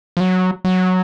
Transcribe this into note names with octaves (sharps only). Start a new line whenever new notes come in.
F3
F#3
F#3